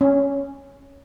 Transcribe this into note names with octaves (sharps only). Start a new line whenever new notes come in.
C#4